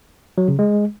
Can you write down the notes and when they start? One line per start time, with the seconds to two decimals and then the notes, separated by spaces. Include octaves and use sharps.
0.38 F#3
0.48 C#3
0.59 G#3